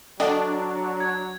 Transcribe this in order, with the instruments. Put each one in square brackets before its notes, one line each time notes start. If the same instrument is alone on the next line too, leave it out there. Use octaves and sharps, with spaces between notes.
[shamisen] D3 D#5 G5 [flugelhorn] F#3 [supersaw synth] D4
[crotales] G#6